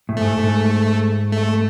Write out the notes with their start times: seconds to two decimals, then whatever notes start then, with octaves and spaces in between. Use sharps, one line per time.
0.09 A2
0.17 G#2 A3
0.26 A2
0.39 G#2
1.32 A3